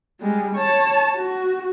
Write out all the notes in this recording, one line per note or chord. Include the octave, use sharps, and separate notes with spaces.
G3 G#3
C#5 A5
F#4